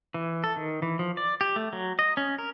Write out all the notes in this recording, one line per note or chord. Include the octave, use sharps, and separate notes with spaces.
E3
A4
D#3
E3
F3
D5
G4
A3
F#3
D#5
C#4
A#4